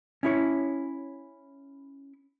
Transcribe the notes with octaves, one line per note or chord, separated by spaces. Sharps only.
C#4 E4 C#5